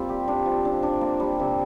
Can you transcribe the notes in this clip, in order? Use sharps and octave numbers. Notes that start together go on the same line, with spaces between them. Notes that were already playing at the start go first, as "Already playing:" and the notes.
Already playing: G3 A#3 C4 F4
G4
D4
F3
D4
D4
A#3
G3
C3